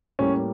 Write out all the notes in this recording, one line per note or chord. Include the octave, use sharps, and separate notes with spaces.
A2 G3 A#3 C#4